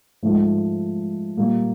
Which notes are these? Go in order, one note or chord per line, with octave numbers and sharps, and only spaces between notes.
G#2 F3 A3
A#2 G3 A#3